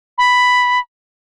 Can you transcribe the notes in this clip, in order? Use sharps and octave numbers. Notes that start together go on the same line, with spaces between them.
B5